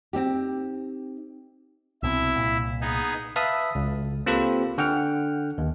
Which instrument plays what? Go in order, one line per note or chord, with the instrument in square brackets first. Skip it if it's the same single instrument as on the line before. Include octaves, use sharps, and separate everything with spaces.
[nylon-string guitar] C4 D#4 G4
[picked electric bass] C2 B2 C4 [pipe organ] E4 E5
[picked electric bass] C2 A#2
[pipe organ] B3 D#4 G#4
[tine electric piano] B4 E5 F5 A5 B5 D#6
C#2
A#3 C4 F4 G4 A4 B4
D3 F#5 G5 F6
D#2